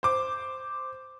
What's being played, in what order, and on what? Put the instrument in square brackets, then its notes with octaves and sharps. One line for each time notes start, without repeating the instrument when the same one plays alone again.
[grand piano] C5 D6